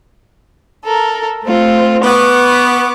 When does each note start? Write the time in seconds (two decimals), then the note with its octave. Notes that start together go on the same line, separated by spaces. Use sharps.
0.84 A4 A#4
1.45 A3 C4 F4
2.03 B3 C#6 D6